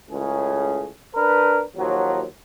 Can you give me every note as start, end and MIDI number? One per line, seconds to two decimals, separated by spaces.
0.11 0.88 37
0.11 0.88 45
0.11 0.88 49
0.11 0.88 68
1.16 1.63 62
1.16 1.63 70
1.16 1.63 71
1.77 2.24 39
1.77 2.24 53
1.77 2.24 54